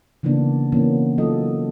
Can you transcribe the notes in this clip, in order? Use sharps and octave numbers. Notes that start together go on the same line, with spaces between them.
C#3 E3 A#3 B3 D4
B2 E3 A#3 B3 C#4
F#3 A#3 D#4 F4 A4 D#5